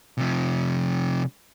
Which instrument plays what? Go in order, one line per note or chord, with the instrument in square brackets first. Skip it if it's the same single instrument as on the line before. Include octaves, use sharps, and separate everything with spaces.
[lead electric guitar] C3 F3